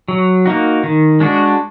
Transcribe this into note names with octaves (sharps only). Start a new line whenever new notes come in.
F#3
A#3 D#4 F#4
D#3
G#3 D4 F#4